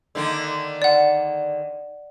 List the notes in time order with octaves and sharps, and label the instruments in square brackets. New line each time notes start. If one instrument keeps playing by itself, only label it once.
[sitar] D3 D#3 A#3
[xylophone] D5 F#5